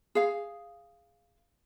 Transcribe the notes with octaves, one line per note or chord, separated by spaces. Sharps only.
G#4 F5